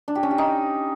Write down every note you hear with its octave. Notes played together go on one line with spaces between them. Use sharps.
D4
G4
C#4
G4
D#4